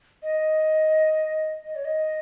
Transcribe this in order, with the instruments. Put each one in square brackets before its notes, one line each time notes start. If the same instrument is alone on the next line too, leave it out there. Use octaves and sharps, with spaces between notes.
[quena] D#5
D#5
C#5
D#5